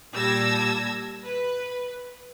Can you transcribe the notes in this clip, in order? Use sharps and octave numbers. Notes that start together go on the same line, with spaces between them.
A#2 G3 A5 E6 G#6 A#6
B4